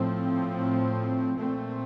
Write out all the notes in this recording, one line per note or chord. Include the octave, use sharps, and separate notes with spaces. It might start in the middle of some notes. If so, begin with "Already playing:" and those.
Already playing: A2 F3 A3 C4
A#2 A3 C4